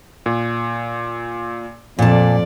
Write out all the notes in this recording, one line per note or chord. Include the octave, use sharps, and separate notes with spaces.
A#2
F2 A#2 D5 A5